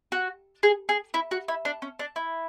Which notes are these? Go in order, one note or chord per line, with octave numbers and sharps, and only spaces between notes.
F#4
G#4
G#4
E4
F#4
E4
D4
C#4
D4
E4